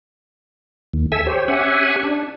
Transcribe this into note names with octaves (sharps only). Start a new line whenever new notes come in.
D#2
A4 E5 G#5 E6
G4 C5 C#5
C#4 G4 E5 F#5 G#5
D4